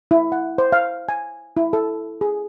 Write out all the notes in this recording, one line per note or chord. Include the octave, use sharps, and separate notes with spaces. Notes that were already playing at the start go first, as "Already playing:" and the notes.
E4
F#5
C5
F5
G#5
E4
A4
G#4